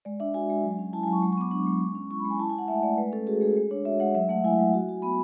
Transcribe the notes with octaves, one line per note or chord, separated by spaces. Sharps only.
G#3 D5
D4 E5
F#4 G#5
G#3
F#3
C#4
E4 A5
G#5
F#3
C#6
G#3
C#6
B3 D6
D4 C#6
G#3
G#3
C#4
E4 C#6
B5
G#3
G#5
E4 A5
G#5
E4
F#5
A3 E5
A3 D5
G#3 B4
C#4 A4
F#4 G#4
G#3 G#4
G#3
D4 C#5
F#4 E5
G#3 F#5
F#3 E5
A3 F#5
E4 G#5
F#3
F#4
F#4
B3 B5